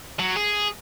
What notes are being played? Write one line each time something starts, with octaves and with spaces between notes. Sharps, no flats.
F#3
G#4